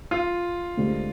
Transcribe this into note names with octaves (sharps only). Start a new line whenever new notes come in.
F4
D2 D3 G#3 C4 G4